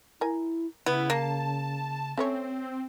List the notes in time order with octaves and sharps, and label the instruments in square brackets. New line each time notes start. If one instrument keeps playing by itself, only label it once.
[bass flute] E4 [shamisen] A#4 G#5
[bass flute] C#3 [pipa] B3 [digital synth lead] E4
[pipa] A#3 [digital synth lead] A5
[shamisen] A3 C#4 C#5 [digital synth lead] C4